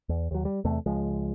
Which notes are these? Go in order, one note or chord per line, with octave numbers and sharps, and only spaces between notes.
E2
D#2 F#3
G3
E2 C3 A3
C#2 F3 G#3